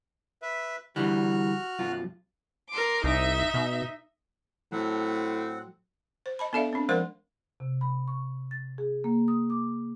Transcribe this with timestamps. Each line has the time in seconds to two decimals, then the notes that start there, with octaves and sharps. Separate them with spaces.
0.42 B4 E5
0.96 D3 E3 G3 F#4 F6 F#6
1.79 B1 F#2 F4
2.70 A#4 C6 D6
3.04 C2 D#4 E5
3.54 B2
4.72 A2 F#3 C4 F#5
6.26 C5
6.39 D#5 A5 B5
6.53 B3 D4 A4 D5 E5 F5
6.73 C4 D4
6.89 F3 G#3 A#4 C5 F#5 C6
7.60 C3
7.81 B5
8.08 C#6
8.51 A6
8.78 G#4
9.04 A#3
9.28 D#6
9.50 D6